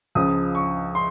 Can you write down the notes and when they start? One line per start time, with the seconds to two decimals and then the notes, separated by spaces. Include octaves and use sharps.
0.15 C#2 C#3 F3 D#6
0.55 C#6
0.95 C6